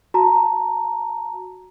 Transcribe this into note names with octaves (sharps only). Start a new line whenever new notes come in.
F#4 A5 A#5